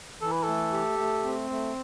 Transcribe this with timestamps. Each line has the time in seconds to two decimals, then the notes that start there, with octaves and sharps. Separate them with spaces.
0.21 E3 A4
0.32 B4
0.43 A3 A4
0.72 G4
0.98 A3
1.24 C4
1.50 A3